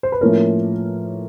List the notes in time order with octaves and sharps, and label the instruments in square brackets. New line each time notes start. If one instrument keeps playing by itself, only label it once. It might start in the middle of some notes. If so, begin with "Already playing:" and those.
[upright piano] C5
B4
A2 F3 A#3 C#4 A#4